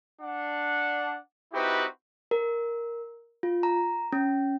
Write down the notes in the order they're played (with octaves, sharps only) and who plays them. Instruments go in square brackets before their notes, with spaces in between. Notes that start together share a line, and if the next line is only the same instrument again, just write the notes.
[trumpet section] D4 F#5
C4 D#4 E4 F#4 G4 B4
[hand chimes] A#4
F4
A#5
C#4